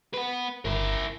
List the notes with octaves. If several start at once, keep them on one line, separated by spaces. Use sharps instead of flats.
B4 F#5
G1 E4 A#4